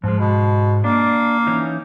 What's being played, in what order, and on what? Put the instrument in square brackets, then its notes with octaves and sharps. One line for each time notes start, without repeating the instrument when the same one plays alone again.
[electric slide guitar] G#2 G#3 [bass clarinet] F3
[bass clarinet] B2
[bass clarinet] A#3 [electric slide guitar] D4
[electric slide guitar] E3 C#4 D#4